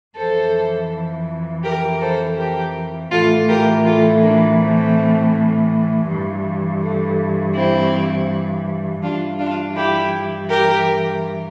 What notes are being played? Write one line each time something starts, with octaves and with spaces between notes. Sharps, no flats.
F2 E3 A4 C5
G4 A#4
A4 C5
G4 A#4
A2 E3 F4 A4
G4 A#4
F4 A4
A#3 D4
A3 C4
G2 E3
A3
C4 E4
G2 E3 D4 F4
D4 F4
E4 G4
G4 A#4